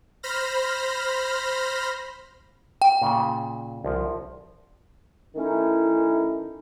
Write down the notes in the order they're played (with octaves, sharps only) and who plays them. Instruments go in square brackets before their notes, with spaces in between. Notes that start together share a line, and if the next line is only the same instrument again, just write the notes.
[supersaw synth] C5 B5 F6 A#6
[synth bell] G5
[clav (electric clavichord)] A#2 C#3
C2 F3
[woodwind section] D#3 A3 C#4 D#4 E4